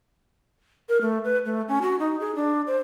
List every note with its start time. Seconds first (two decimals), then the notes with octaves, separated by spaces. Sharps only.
0.89 A#4
1.01 A3
1.24 B4
1.46 A3
1.68 C#4
1.82 F#4
1.99 D#4
2.20 G#4
2.35 D4
2.67 C5